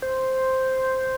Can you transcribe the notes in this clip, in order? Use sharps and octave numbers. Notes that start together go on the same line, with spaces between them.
C5